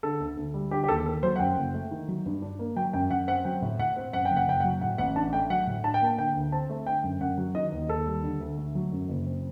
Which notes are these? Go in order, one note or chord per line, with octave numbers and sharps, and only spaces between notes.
D3 A4
D2
D2
G3
D3 G4
G4
D#2 A4
A#3 A4
F#3 C5
F#5
F#2 G5
F#1
A3
D#3
F#3
G2
D4
A#3
F#3 G5
F#2 G5
F#2 F#5
C4 F#5
F#3 G5
A2
A2 F#5
C4
F#2 F#5
G5
F#1
F#5
F#1 G5
F#5
F#3
A2 F#5
A1 F#5
D4 A5
A3 G5
F#3 F#5
A2
D4 A5
G5
A#3 A5
D3 G5
D2
C4 A5
A3
D3 G5
F#2
F#2 F#5
F#3
D#3 D#5
D#2
D#2 A4
G3
D3
D2
A3
F#3
F#2
F#1
C4